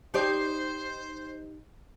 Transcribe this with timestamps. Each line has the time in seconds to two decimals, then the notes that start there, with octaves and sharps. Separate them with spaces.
0.14 D#4 G4 C5 D5